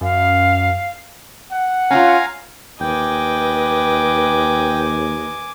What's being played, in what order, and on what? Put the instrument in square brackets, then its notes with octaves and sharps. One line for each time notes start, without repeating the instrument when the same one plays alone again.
[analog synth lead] F#2 [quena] F5
[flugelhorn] F#5
[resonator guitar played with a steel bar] C#4 D#4 F4 [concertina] F5 G#5 A#5
[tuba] D#2 [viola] B4 D#5 [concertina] G5 [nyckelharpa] G#5 D6